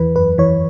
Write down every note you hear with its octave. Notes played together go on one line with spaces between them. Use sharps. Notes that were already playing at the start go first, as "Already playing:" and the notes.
Already playing: E2 E3 B4
F#2 B4
E3 C#5